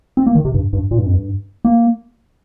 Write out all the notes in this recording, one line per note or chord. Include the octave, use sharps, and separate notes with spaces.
C4
A#3
D#3
C3
G2
G2
A#2
G2
F2
G2
A#3